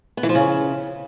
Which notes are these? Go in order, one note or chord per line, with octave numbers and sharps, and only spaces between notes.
B3
E3
F3
C#3